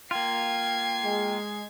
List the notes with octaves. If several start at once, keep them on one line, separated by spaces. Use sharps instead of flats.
A#3 F4 G5 G#6 C7
G#3